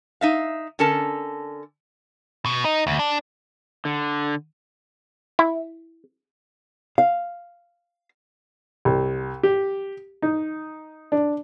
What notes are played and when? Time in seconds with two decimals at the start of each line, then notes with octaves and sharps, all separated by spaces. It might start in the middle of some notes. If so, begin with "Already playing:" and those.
0.21 D#4 E5 F5
0.79 D3 C#4 A4 A#4 A5
2.46 B2
2.65 D#4
2.87 D2
2.99 D4
3.85 D3
5.39 E4
6.98 F5
8.85 C2
9.43 G4
10.22 D#4
11.12 D4